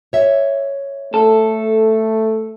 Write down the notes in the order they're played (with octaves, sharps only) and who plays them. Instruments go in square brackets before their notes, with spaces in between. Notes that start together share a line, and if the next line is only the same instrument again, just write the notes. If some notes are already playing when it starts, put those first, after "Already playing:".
[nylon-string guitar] C#5 E5
[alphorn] A3 [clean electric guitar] A4